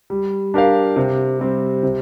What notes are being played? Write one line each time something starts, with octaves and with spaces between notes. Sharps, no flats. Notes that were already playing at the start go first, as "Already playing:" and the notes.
G3
D4 G4 A#4 F5
C3
G3 C4
C3